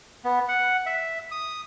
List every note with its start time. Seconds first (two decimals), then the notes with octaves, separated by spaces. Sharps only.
0.25 B3
0.48 F#5
0.86 E5
1.31 D#6